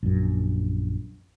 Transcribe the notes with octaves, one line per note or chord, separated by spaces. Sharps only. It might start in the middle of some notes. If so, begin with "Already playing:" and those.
A#1 F#2